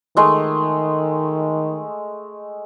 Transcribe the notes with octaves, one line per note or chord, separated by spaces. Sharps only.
D#3 G#3 A3 D#5